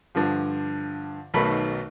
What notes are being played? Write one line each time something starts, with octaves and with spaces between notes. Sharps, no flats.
G2 D3 F3
B1 B2 D#3 A3 B5 C#6